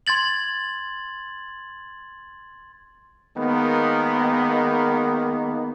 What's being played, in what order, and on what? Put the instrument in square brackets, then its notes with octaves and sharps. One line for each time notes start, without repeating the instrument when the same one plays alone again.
[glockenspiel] C6 G#6 A6 F#7
[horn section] D#3 G#3 A#3 B3